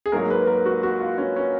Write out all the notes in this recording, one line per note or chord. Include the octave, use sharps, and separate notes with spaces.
G#4
G#2 F#3 A#3 A#4
B4
A#4
F#4
F#4
F4
C#4
C#4